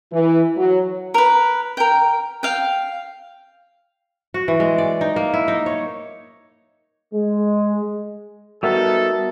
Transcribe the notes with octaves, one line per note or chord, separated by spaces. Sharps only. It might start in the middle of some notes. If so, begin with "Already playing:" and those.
E3
F#3
A#4 B4
A#4 G5
F5 G5
F#4
E3
G#3
D5
D#4
A#3
E4
D#4
C#5
G#3
G3 B3 D#4 F#4 A4 A#4 E5